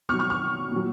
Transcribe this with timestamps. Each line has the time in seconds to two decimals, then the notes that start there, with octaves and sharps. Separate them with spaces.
0.09 B2 C#6 F6
0.13 F#3
0.19 C#6 F6
0.30 C#6 F6
0.72 A#2 F#3